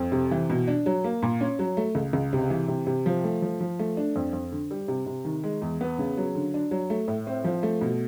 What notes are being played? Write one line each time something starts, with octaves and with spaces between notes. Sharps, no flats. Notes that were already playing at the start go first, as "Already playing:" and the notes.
Already playing: F2
C3
E3
B2
D4
F#3
A#3
A#2
C#4
F#3
A3
C#2
C#2
C3
E3
C3
C3
F3
A3
F3
F3
A3
D4
F2
F2
D3
G3
C3
C3
D#3
G#3
E2
B3
C#3
F#3
D3
D4
F#3
A3
A2
C4
F3
A3
B2